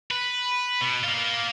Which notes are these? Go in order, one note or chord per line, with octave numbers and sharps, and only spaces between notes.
B4
B2
A#3 F4